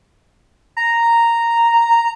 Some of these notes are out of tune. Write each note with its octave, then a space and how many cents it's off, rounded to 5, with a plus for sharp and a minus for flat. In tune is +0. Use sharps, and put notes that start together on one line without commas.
A#5 -5